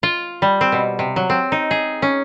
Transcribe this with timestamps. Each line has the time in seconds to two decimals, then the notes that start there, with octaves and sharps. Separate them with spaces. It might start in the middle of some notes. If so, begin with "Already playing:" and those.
0.03 F4
0.42 G3
0.61 C4
0.72 B2
0.99 C3
1.16 F#3
1.30 C4
1.52 D#4
1.71 G#4
2.02 C#4